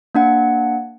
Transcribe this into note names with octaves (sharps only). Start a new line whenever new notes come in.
A#3 D4 F#5